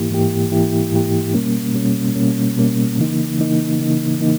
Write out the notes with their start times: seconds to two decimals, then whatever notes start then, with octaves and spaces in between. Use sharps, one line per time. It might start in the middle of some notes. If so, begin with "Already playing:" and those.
Already playing: G#2 E3 A#3 E4 G4
0.10 G#2 E3 A#3 E4 G4
0.51 G#2 E3 A#3 E4 G4
0.92 G#2 E3 A#3 E4 G4
1.34 B2 G3 A#3 C#4
1.74 B2 G3 A#3 C#4
2.15 B2 G3 A#3 C#4
2.56 B2 G3 A#3 C#4
2.98 C#3 E3 A#3 D#4
3.38 C#3 E3 A#3 D#4
3.79 C#3 E3 A#3 D#4
4.20 C#3 E3 A#3 D#4